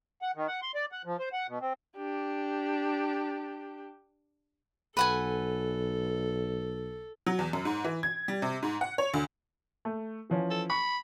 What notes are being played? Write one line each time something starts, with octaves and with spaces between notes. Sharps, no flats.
F#5
D#3
F#5
C6
D5
F#5
F3
C5
F#5
B2
C4
D4 G4
B1 A4 B4 F#5 G#5
F#3
E2
F#2
G#2
E3
G#6
G3
C3
G#2
F#5
C#5
D2
A3
E3 F3 C#4
A4
B5 C#6